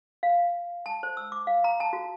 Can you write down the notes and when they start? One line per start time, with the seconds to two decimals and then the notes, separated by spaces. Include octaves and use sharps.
0.23 F5
0.86 A5
1.03 C5
1.17 E6
1.32 D6
1.47 F5
1.64 A#5
1.80 A5
1.93 F#4